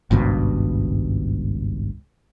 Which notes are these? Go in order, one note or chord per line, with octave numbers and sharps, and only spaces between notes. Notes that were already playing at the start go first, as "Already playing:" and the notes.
G#1 C#2 G2 B2